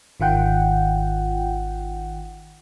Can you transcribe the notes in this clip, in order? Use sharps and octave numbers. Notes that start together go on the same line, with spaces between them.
G#1 D#3 F4 F#5 G5